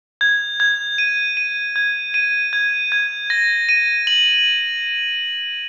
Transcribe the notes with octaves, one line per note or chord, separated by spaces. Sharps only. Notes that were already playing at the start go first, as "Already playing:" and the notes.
G#6
G#6
D#7
D#7
G#6
D#7
G#6
G#6
A#6
D#7
F#7